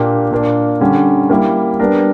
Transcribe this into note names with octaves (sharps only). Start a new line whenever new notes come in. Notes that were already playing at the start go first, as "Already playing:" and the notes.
Already playing: A#2 A#3 D4 G4
A#2 A#3 D4
D3 G3 C#4
G3 A#3 E4
G3 B3 D4 A#4